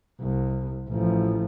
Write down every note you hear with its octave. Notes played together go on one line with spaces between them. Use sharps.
C2
A1 F3